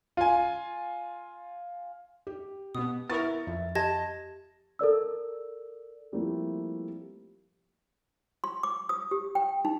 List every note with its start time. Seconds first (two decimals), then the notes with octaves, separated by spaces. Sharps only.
0.17 F4 G#5
2.27 G4
2.75 B2 B3 D#6
3.10 B3 E4 A#4 E5 C#6 A6
3.47 F2 E5
3.75 G4 D#5 A5 G#6 A#6 E7
4.79 A4 A#4 D5 E6
6.12 F3 G3 A3 A#3 C4 E4
8.44 C6
8.63 D6
8.89 D#6
9.11 G4
9.35 G5
9.65 D#4